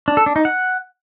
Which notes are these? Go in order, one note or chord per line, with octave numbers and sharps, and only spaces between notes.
D4
A4
D4
D#4
F#5